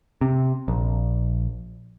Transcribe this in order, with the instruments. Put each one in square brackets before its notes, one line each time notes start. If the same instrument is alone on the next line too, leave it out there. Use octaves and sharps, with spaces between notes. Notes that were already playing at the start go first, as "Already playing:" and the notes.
[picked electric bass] C3
A#1